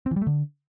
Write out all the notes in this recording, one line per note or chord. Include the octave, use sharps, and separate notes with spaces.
C4
E3
G3
A3
D3